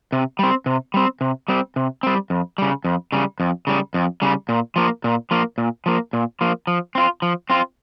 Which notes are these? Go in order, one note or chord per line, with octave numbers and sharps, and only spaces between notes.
C3
G3 C4
C3
G3 C4
C3
G3 C4
C3
G3 C4
F2
C#3 G3
F2
C#3 G3
F2
C#3 G3
F2
C#3 G3
A#2
F3 A#3
A#2
F3 A#3
A#2
F3 A#3
A#2
F3 A#3
F3
C4 F4
F3
C4 F4